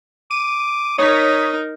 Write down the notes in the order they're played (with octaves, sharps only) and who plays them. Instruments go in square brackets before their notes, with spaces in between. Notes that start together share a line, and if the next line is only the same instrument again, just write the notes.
[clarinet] D6 [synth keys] D#7
[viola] D#4 A#4 [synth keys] C#5 B6 [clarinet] D#6